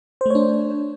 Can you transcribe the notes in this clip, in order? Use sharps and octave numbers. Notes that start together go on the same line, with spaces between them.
A3 D4 C5 C#5